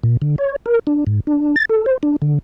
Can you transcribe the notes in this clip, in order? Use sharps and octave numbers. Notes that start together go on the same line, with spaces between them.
A#2
D3
C#5
A#4
D4
G#2
D4
A6
A4
C5
D4
D3